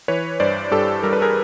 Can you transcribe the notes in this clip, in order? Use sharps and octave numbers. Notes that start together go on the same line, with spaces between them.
E3 B4 C#5
G2 C5 D5
G2 G4 A4
G3 A#4
B4
G#4 A#4